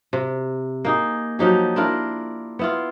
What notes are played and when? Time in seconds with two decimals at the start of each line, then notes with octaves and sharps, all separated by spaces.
0.13 C3
0.85 A#3 D#4 G#4
1.39 F3 F#3 D#4 G4
1.76 D4 E4 F4 A#4
2.59 B3 E4 F4